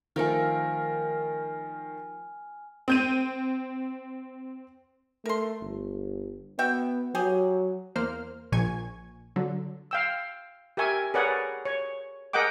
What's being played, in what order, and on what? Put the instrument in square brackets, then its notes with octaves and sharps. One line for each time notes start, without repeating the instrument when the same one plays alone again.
[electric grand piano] D#3 A#4 [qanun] F3 A3 A4 [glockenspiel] G#5 F6
[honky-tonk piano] C4 G6 D#7
[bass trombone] A3 [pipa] A#4 C6
[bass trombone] G1
[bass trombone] B3 [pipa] F#4 E5 G5
[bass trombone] F#3 [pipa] G4 G#4
[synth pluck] E2 A#3 C5 F6
A#1 A#2 F3 G#5 C#6 G#6
D3 F#3
[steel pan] F5 G5 E6
G4 A#4 E5 G#5 C#6
G#4 A#4 B4 C#5 D5 F#5
C#5
G#4 A#4 D#5 F#5 G5 D6